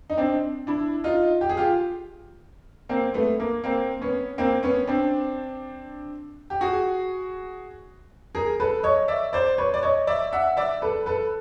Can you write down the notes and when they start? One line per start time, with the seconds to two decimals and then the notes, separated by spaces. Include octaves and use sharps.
0.10 D#4
0.18 C4 D4
0.67 D4 E4
1.04 D#4 F4
1.41 G4
1.49 G#4
1.57 F4 G4
2.89 A#3 C4
3.14 A3 B3
3.40 A#3
3.64 A#3 C4
4.01 B3 C#4
4.38 A#3 C4
4.63 B3 C#4
4.87 C4 D4
6.50 G4
6.61 F#4 G#4
8.35 G#4 A#4
8.60 A4 B4
8.83 C#5 D#5
9.08 D5 E5
9.33 C5 D5
9.58 B4 C#5
9.74 D5
9.83 C#5 D#5
10.07 D5 E5
10.33 E5 F#5
10.57 D5 E5
10.82 A4 B4
11.06 A4 B4